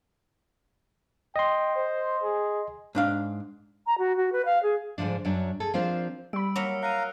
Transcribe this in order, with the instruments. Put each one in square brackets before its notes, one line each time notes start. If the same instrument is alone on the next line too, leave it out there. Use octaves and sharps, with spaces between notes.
[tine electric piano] D#5 C6 [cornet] G5
[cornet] C5
G#4
[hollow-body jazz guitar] G#2 D4 F5
[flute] A#5
F#4
F#4
B4
F5
G#4
[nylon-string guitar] G#2 D3 D#3 F3 D4
F#2 F#3 D4
G#4 A4
F3 C4 D4 F4 A#4 C5
[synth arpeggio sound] G3 B5 [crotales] E6 D7
[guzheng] F#3 A#3 E5 [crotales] F6 C#7 F7
[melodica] F5 A#5 [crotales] F#6 D#7